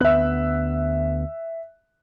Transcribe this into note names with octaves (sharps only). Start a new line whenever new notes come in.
D2 B3 E5 F#6